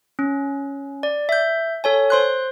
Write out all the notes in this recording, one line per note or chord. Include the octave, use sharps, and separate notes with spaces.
C#4
D5
E5 G6
A4 C#5 G#5
C5 C6 F#6